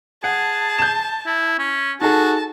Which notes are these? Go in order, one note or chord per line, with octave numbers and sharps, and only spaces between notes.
G#4 F#5 A5
G6 E7
E4
C#4
D#4 F#4 G#4 A4 A5